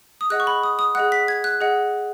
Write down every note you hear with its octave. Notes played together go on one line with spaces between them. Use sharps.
D#6
G#4 D#5 F#5 F#6
C#6
B5
D#6
D#6
G#4 D#5 F#5 F#6
B6
G#6
F#6
G#4 D#5 F#5